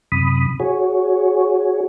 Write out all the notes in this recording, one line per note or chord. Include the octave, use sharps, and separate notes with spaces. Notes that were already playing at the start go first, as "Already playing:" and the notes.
F#2 C3 B5 D#6
F#4 G#4 C#5